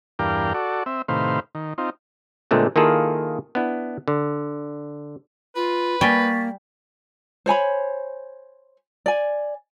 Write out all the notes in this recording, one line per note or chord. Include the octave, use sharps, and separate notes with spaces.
E2 G2 D4 A#4 F5 G5
F#4 A4 D5
C4 E5
A2 C3 D#3 B4 C5 F5
D#3
C4 D#4 F4
A#2 D3 G#3 A3 C4
D#3 A#3 E4 F4 G#4 A4
B3 D4 E4
D3
F4 B4
G3 A#3 G5 G#5 C#6 A6 B6
C5 C#5 G#5 B5
D5 G#5